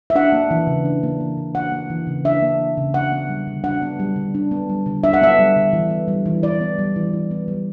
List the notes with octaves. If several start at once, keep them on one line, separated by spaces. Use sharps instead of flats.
E5
D4 F#5
A#3
E3
C#3
D4
A#3
E3
C#3
D4 F#5
A#3
E3
C#3
D4 E5
A#3
E3
C#3
D4 F#5
B3
G3
D3
D4 F#5
B3
G3
D3
D4
B3
G3
D3
D4 E5
F#5
B3 E5
G3
D3
E3
B3
G3
E3
E3 D5
B3
G3
E3
E3
B3
G3